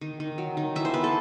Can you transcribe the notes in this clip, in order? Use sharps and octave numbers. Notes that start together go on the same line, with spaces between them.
D#3
D#3
F#3
D#3
E3 E5
C5
B3 B4
A4